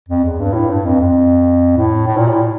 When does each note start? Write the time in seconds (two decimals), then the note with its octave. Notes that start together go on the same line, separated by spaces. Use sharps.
0.08 F2
0.24 E2
0.39 G2
0.54 A2
0.70 G2
0.85 F2
1.00 F2
1.77 A2
2.07 A2
2.17 A#2
2.28 A2